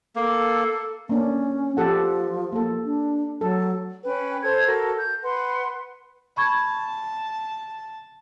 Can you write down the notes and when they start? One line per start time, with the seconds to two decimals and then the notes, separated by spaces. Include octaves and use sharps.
0.16 A#3 A4
1.09 A#3 C#4 D4
1.77 F3 G4 A4 F#5
2.53 A#3 A4
2.85 D4
3.41 F#3 A4
4.04 C#4 B4 G5
4.42 A4 C5 G#6
4.67 F#4 A4 A#4
4.96 G6
5.23 B4 F#5 C6
6.37 A5 B5 C#6 G#6